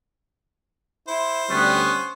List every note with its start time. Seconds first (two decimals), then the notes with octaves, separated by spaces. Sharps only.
1.08 E4 C5
1.49 D2 G3 B3 C#4